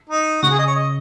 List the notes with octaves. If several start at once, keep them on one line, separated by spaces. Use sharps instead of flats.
D#4
C#3 F#4
G#4
D#5
C#5
D#5